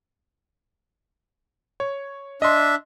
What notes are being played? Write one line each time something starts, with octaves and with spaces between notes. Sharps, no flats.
C#5
D4 D#5 E5 C6